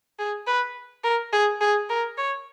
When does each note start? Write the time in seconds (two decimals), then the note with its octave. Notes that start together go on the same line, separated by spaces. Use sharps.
0.19 G#4
0.47 B4
1.04 A#4
1.33 G#4
1.61 G#4
1.90 A#4
2.18 C#5